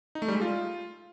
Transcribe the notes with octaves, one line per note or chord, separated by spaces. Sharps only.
D#4
A3
G3
G#3
F4